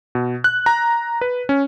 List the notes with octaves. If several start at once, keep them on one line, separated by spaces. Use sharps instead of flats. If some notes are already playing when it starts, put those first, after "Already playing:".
B2
F#6
A#5
B4
C#4